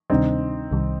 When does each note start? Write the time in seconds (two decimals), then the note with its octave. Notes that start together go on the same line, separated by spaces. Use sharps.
0.10 D2 C3 D#3 G3 C4 D4 D#4
0.71 C2 C3 D#3 G3